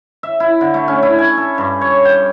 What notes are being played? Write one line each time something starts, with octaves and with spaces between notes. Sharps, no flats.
E5
E4
D3
A3
C#4
E4
G#5
A4
G2
C#5
G5